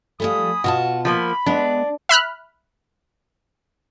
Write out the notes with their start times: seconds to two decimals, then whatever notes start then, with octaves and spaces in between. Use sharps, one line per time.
0.20 F3 G3 A3 G#5 B5 D#6
0.64 B2 F4 F#4 A5
1.05 F3 A3 A#3 B5
1.46 G#3 B3 D4
2.09 E5 B5 F6 F#6